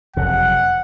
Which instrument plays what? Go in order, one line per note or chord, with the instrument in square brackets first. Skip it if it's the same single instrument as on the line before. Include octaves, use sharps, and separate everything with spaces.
[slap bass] F#1 F2 C3 [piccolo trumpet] F#5